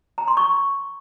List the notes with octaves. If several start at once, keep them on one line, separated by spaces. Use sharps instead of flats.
A#5
C6
C#6